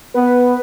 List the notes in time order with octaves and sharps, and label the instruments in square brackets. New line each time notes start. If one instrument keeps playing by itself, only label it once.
[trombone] B3 [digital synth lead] B4